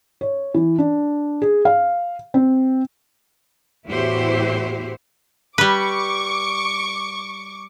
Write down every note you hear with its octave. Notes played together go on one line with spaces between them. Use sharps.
C#5
E3
D4
G#4
F5
C4
E2 A2 E4 F#4 G4 C5
G3 B4 C#6 D6